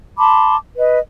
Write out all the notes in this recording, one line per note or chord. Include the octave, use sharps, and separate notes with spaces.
A5 B5 C6 D6
B4 D#5